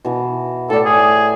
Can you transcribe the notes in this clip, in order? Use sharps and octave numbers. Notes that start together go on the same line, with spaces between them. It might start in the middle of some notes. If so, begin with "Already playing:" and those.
B2 E3
A2 A4 D5
G#4